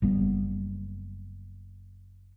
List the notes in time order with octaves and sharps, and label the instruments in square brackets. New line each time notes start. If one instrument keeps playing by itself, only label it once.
[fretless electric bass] F#1 G3 B3